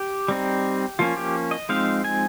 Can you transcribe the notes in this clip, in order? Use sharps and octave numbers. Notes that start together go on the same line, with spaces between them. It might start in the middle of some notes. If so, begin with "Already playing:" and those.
Already playing: G4
G3 C4 D#4
F3 A#3 C#4 F4
G4
D#5
F3 G#3 C4 D#4 F5
G#5